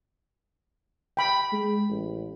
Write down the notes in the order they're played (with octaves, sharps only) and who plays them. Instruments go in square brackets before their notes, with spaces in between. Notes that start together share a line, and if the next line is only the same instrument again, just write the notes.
[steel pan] G5 B5
[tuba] G#3
A1